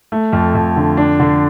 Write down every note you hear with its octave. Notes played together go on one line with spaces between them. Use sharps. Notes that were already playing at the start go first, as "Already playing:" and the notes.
A3
F2
F2
D3
D4
D3